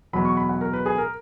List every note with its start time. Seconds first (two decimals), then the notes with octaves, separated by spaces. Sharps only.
0.13 E2 B2 F#3 B5
0.25 C#6
0.37 B5
0.49 F#5
0.61 A#4
0.73 B4
0.86 G#4
0.98 A#4